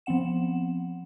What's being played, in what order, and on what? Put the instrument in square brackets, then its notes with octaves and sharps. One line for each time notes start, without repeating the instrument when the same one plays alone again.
[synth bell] F3 B3 C4 F#5 E7